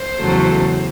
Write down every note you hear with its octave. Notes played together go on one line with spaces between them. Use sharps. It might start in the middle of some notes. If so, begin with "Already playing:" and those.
Already playing: C5
E2 C#3 F#3 A3